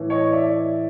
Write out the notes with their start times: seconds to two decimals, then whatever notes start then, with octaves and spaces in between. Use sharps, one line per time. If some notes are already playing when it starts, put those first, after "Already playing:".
Already playing: A2 E3
0.10 C#5 D#5
0.32 D5 E5